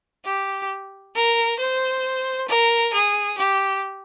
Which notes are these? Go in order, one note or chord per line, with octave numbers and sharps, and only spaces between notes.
G4
A#4
C5
A#4
G#4
G4